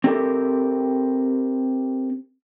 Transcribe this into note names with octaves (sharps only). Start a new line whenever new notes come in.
C4 G4 A4 A#4